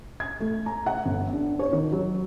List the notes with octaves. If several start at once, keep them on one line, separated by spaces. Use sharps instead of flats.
G#6
A3
A#5
F#5
G1
D4
C#5
D#3
F#3